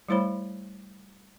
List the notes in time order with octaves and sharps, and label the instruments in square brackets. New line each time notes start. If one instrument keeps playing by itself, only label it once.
[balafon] G3 A3 E4 C5 C#5 B5